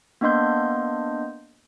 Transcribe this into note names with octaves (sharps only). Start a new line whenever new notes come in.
A#3 B3 D4 D#5 C6 G6